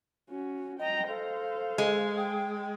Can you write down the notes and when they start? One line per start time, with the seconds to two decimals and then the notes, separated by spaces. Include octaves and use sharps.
0.30 C#4 F#4
0.79 D#5 G5 A#5
1.08 A4 C5 F5
1.78 G#3
2.17 G5